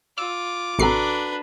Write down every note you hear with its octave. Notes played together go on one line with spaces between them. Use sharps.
F4 D6 E6
A1 C3 D4 F#4 A4 B4 A#5 C7